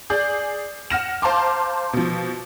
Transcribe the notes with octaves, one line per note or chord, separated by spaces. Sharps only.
G#4 D5 G6
F#5 F6 A#6 E7
C5 F5 A5 A#5 C6 D6
B2 F3